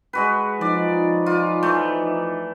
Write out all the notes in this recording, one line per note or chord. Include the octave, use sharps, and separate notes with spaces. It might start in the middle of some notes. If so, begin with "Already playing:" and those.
G#3 F#4 B4
F3 D#4 D5
F4
E3 A3